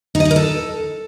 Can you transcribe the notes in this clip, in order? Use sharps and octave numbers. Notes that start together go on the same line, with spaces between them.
D#4
D#5
D#4
A#4
A4